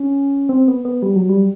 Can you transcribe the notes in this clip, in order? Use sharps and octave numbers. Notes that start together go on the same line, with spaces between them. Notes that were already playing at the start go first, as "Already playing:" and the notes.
Already playing: C#4
C4
B3
B3
G3
F#3
G3